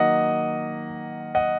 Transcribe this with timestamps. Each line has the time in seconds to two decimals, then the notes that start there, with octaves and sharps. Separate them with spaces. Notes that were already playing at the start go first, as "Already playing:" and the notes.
Already playing: D#3 F#3 A#3 D#5 F#5
1.35 D#5 F#5